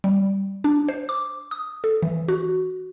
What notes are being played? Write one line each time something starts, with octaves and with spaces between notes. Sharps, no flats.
G3
D4
C5
D6
D#6
A4
E3
F#4